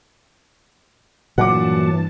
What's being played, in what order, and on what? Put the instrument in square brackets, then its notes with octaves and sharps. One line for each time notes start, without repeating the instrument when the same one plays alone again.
[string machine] G2 E3 A5 [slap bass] A#2 F#3 [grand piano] F#5 D6